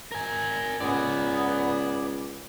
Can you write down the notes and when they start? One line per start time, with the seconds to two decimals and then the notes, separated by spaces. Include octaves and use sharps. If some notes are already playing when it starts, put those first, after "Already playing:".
0.12 A#4 G#5
0.81 C#2 B3 D5 G#5